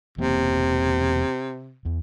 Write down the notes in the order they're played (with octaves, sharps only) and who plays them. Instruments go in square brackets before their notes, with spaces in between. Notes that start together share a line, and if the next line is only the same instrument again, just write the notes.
[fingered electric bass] E1 E2 A#3 [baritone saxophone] C3
[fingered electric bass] E2